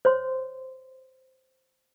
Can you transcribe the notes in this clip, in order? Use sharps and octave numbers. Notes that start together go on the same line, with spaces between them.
C5 C#5 C6